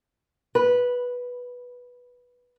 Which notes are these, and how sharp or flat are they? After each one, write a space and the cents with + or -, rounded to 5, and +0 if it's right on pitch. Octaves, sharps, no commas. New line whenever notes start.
B4 -10